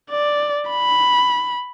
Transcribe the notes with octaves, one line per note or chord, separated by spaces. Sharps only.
D5
B5